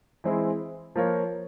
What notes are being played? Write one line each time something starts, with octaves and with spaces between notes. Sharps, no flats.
E3 G#3 C4 E4 G#4
F3 A#3 F4 A#4 C#5